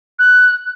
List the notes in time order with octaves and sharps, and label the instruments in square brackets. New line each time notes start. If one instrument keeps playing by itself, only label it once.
[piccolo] F#6